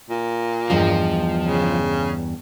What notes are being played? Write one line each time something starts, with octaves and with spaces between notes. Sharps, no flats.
A#2
E2 G2 F3 D#5
C#3